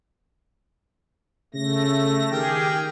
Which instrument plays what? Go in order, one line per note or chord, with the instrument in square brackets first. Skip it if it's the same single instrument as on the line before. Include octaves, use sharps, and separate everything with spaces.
[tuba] C#3 [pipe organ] A3 A#6
[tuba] D#3 [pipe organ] G4 G#4 [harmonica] A#4 G5